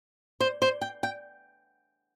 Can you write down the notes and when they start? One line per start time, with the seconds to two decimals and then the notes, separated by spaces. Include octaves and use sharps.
0.40 C5
0.62 C5
0.81 G5
1.03 G5